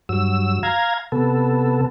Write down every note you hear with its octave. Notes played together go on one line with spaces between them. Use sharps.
G2 F#3 E6
F5 A#5 G#6
C3 B3 A4